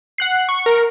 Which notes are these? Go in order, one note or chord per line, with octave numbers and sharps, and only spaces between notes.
F#5 F#6 C7
C#6
A#4